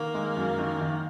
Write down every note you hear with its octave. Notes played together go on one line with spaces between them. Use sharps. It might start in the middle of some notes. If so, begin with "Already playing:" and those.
Already playing: D#3 A#3
G#3
F#2
D#3
D#3